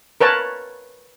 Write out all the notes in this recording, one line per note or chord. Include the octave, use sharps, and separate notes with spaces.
A#4 B4 C#5 A5